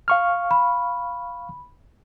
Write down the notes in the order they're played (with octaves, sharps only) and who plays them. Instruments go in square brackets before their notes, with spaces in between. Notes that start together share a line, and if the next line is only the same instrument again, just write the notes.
[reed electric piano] F5 C#6 F6
[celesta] B5